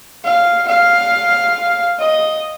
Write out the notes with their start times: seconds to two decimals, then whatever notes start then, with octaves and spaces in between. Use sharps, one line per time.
0.25 F5
0.68 F5
1.99 D#5